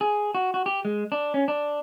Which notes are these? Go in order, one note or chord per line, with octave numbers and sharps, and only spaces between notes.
G#4
F#4
F#4
G4
G#3
D4
C#4
D4